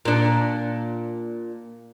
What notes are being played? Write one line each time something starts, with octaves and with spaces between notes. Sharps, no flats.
A#2 D4